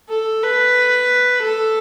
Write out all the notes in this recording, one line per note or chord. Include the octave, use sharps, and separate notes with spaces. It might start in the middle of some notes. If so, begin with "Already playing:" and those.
A4
B4
A4